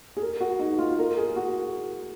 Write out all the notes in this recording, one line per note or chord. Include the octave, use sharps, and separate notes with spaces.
G#4
A#4
F#4
D#4
F4
A#4
G#4
F#4